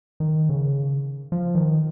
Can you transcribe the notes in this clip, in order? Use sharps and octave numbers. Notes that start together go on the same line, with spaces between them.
D#3
C#3
F3
D#3